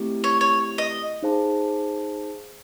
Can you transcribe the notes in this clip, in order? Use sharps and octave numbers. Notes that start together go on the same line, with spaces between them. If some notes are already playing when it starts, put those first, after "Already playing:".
Already playing: A3 C4 E4 G4
C#5
C#5
D#5
D#4 G#4 C5 F5 A5